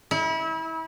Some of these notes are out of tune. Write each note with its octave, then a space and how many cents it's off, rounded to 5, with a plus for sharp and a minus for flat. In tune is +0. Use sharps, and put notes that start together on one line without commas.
E4 -30